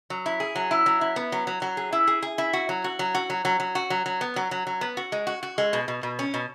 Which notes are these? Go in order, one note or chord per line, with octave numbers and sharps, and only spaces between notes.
F#3
E4
G#4
F#3
E4
F#3
E4
B3
F#3
F#3
F#3
G#4
E4
G#4
G#4
E4
F#4
F#3
F#4
F#3
F#4
F#3
F#3
F#3
F#4
F#3
F#3
B3
F#3
F#3
F#3
B3
F#4
G#3
F#4
F#4
G#3
B2
B2
B2
C#4
B2